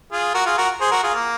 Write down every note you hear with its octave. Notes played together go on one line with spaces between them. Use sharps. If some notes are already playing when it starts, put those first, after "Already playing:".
F4 G#4
F#4 A#4
F4 G#4
F#4 A#4
G#4 C5
F#4 A#4
F4 G#4
A#3